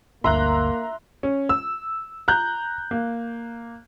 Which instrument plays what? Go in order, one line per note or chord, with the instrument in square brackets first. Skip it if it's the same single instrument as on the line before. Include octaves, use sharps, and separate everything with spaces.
[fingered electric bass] G1 D2 [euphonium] A#3 [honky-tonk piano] E5 A#5 F#6 [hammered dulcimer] C6
[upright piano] C#4
E6
A#5 F#6 G6
A#3